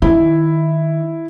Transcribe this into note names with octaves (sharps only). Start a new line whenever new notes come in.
D#3 E4